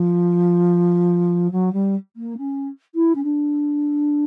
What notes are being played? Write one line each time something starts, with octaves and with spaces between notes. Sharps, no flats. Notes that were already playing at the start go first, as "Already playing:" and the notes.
Already playing: F3
F#3
G3
A#3
C#4
E4
C#4
D4